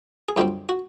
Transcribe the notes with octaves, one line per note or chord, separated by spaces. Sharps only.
G#4
F#2 D3 G3 C4 F4 G4
F#4